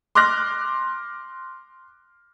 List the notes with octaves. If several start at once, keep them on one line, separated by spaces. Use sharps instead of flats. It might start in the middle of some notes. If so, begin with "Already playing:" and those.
C6 D6 F6 F#6 A#6